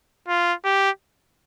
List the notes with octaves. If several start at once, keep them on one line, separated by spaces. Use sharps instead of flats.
F4
G4